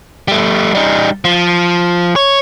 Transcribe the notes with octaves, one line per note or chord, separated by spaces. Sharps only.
G3 A3
G3 D#4
F3
C#5